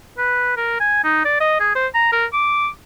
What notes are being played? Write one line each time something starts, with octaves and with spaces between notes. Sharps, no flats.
B4
A#4
G#5
D#4
D5
D#5
G#4
C5
A#5
A#4
D6